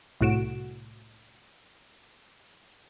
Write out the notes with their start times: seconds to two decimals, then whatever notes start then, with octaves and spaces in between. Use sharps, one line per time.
0.21 C2 A2 F#4 D7 E7